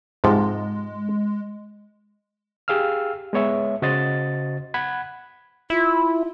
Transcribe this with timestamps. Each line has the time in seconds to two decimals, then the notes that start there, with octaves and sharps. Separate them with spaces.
0.24 G#2 C3 F3 G#3
2.68 G4 G#4 F5 E6 F6
3.33 G#3 B3 C#5 E5
3.82 C#3 F#4 C5 D#5 A6
4.74 F#5 B5 F#6 G#6
5.70 E4 F4